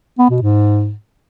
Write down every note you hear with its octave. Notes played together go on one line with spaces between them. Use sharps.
B3
B2
G#2